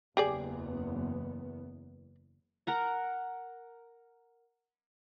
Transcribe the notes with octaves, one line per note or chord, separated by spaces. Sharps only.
F#1 E2 B3 G4 G#4 D5
A#4 F#5 A#5